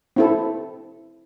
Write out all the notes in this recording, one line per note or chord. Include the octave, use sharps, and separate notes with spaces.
C4 E4 A4